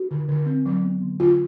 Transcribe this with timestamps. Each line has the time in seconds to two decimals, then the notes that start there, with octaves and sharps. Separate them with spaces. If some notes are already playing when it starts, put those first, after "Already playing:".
Already playing: F#4
0.11 D3
0.28 D3
0.46 C4
0.66 F#3
0.84 B3
1.01 D3
1.20 D3 F4